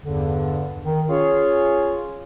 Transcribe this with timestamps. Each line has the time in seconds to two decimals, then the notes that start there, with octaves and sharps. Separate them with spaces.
0.04 E2 G2 D3
0.83 D#3
1.09 C#4 F4 G#4 C#5